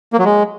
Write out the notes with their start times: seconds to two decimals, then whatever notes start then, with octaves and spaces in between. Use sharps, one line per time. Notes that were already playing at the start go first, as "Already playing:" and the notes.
0.13 A#3
0.19 F#3
0.25 G#3